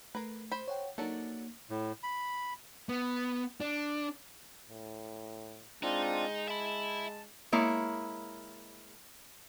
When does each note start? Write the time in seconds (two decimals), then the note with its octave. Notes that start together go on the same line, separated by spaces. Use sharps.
0.15 A3 A#4 B4
0.52 C5 B5
0.68 C#5 F#5 G5
0.98 F#3 A#3 D4 D#4 A4
1.70 A2
2.03 B5
2.89 B3
3.61 D4
4.69 A2
5.83 G#3 C4 D4 D#4 F4
6.48 E5 A5 B5
7.52 G#3 A#3 E4 C#5